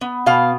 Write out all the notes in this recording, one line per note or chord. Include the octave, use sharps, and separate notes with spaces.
B3
B2 F5